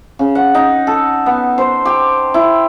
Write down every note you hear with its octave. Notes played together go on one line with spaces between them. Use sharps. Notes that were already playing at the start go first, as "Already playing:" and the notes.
C#3
F#5
D#4
A4
B3
C5
G4
E4